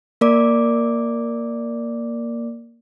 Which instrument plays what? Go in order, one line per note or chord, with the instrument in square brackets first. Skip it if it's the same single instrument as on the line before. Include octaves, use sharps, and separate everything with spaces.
[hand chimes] A#3 A#4 D5 D6